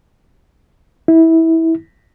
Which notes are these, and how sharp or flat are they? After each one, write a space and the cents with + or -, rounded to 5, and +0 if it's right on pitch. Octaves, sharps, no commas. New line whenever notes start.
E4 -20